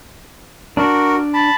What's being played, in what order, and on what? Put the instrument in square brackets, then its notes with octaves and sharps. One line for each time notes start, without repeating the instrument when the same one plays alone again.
[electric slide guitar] D4 [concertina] F#4 A#4
[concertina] A5 B5